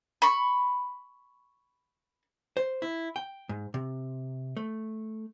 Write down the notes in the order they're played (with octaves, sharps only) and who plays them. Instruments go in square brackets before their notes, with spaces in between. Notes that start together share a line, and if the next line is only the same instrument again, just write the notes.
[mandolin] B5 C#6
[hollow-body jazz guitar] C5
E4
G5
G#2
C3
A3